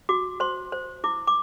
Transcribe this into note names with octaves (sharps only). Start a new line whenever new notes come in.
F#4 D6
C5 C6
C5
E4 D6
D6